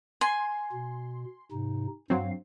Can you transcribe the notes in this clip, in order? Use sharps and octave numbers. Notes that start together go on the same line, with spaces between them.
G#5 C6
B2
G#2 C3 D#4
G2 F#3 C4 F5